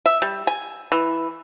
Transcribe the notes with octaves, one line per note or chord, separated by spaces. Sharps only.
E5
G3
G#5
E3